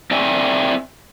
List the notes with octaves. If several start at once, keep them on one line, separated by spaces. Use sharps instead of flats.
C4 D5 E5 G5 G#5